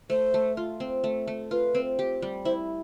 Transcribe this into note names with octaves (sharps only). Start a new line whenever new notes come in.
A3 C5
A3
F4
C4
A3
A3
F4 B4
C4
G4
G3
E4 C5